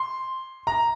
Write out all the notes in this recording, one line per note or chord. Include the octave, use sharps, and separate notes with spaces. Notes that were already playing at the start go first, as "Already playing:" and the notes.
Already playing: C6
A#5